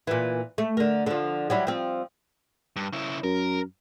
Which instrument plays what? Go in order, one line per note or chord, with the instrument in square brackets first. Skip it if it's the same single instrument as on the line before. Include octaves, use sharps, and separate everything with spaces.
[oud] A#2 E3
A3
D3 A#4
D3 F3
F#3 G3 E4
F3 C4
[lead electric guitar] G2
C#3 E4
[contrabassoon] F#2 [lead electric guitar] A#4